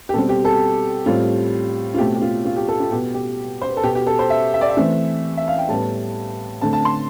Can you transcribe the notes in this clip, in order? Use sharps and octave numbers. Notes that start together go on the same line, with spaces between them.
G4
B2 G3 C4 A4
G4
A4
A2 G3 C4 F4
F4
B2 A3 C4 G4
G4
F4
F4
G4
A4
F4
B2 B3 G4
G4
C5
B4
A4
B2 B3 G4
G4
A4
C5
E5
E5
D5
E5
E3 A3 C4
E5
F5
G5
A2 G3 B3 A5
D3 A3 C4 A5
A5
C6